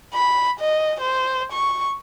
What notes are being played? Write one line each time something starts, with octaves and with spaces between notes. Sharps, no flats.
B5
D#5
C5
C#6